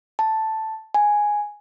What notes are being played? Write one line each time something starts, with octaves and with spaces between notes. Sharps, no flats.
A5
G#5